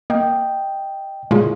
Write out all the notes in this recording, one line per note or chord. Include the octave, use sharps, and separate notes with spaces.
A#3 D#5 G5
A#2 C#3 G#3 E4 F4 G#4